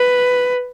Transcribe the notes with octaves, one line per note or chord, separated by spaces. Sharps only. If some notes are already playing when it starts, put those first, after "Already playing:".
Already playing: B4